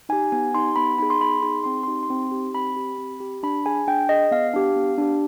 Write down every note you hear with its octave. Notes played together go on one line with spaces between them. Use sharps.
D#4 G4 G#5
B3 G#5
D#4 G4 C6
B3 B5
D#4 G#4 B5
C6
B3 B5
D#4 G#4 C6
C4 C6
D#4 G4 C6
C6
C4
D#4 G4
C4 B5
G4
C4
G4
D4 B5
G#4 G#5
D4 G5
G#4 D#5
B3 F5
D4 G4
B3
D4 G4